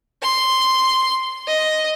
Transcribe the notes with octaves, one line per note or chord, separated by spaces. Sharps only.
C6
D#5